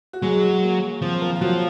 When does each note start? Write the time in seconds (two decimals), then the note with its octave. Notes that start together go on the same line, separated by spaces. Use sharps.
0.13 F#4
0.22 F#3 G#3 G#4
0.63 A#3
1.02 F3 C4
1.21 A#3 A#4
1.36 F4
1.41 F3 F#3 F#4